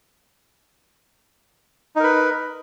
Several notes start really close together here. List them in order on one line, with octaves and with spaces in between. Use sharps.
D#4 A#4 B4